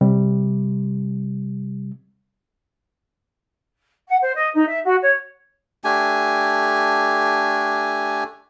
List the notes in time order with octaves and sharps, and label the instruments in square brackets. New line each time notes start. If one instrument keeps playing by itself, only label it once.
[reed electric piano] C3 G3
[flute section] F#5
C5
D#5
D#4
E5
F#4
C#5
[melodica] A3 D4 G4 G#5